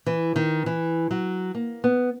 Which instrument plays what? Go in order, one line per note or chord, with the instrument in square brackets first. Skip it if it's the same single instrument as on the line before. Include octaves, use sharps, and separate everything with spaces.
[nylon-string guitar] E3
D#3
E3
F#3
A#3
B3